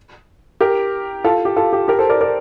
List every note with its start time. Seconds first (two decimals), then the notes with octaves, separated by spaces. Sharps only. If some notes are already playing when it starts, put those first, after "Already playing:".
0.61 G4 A#4
1.25 F4 A4
1.45 G4
1.56 F4 A4
1.73 G4
1.88 G4 A#4
1.99 A4 C5
2.09 A#4 D5
2.21 A#4 D5